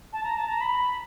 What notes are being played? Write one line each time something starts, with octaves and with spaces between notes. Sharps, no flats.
A5
A#5
A5
A#5
B5